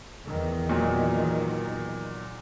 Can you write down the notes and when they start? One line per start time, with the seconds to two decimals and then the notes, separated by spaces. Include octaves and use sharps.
0.25 E2 D#3
0.69 A#2 F#3